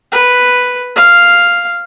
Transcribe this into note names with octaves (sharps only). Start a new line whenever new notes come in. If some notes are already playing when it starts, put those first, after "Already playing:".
B4
F5